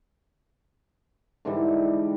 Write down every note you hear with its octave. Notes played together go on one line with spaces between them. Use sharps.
G#2 D3 E3 G3